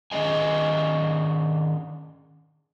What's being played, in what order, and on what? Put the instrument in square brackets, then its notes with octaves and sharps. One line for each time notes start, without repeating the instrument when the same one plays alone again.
[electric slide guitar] D#3 C#4 G#4 D#5 G#5